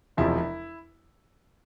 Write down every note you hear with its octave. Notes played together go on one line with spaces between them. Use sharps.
E1 E2 C3 F3 E4